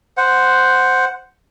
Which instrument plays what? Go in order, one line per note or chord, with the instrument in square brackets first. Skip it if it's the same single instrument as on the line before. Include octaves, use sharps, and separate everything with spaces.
[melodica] C5 F#5